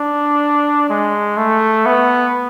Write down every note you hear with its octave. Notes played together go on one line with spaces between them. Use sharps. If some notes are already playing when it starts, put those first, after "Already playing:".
Already playing: D4
G#3
A3
B3